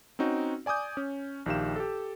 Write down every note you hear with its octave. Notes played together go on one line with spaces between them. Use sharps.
C4 C#4 D#4 F#4
D5 G#5 D6 D#6 G6
C#4
A#1 D#3 G4 F5 E7
G4 A4